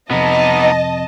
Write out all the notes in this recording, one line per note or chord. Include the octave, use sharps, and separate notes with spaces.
F2 C3 B3 D#4 D#5 A5